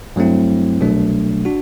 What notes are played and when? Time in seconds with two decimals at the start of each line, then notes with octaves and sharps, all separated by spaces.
0.16 G2 F#3 A3 C4 E4
0.81 C2 B2 F#3 A3 D4
1.45 D4 F#4